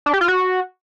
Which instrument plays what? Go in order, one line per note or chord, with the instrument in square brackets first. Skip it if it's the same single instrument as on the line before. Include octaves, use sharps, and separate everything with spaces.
[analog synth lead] D4
G4
F4
F#4